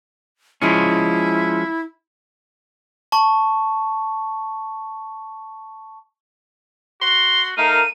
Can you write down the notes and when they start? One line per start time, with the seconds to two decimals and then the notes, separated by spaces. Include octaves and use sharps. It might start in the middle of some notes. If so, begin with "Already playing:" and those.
0.62 F3 G#3 C#4 E4
3.12 A5 C#6
7.01 F#4 C6
7.57 A3 D#4 A#4 F5 D#7